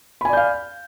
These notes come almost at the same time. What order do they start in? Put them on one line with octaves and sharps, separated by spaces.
B5 G#5 D5 G6 F5